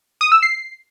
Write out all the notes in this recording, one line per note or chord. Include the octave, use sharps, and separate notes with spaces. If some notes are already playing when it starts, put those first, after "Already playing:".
D#6
E6
C7